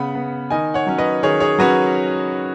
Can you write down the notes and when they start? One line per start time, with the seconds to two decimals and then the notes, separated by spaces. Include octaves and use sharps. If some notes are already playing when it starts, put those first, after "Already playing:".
Already playing: C#3 B3 F#5 B5
0.15 B3
0.50 D#3 D#5 G#5
0.74 C#5 F#5
0.87 F#3 C#4
0.98 B4 D#5
1.23 D#3 G#4 C#5
1.40 G#4 C#5
1.58 F#3 C#4 F#4 B4